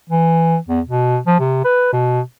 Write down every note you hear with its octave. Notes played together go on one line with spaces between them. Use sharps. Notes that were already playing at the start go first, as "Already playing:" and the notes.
E3
E2
B2
F3
C3
B4
B2